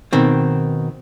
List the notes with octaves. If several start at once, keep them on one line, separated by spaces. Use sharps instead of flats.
B2 D#3 C4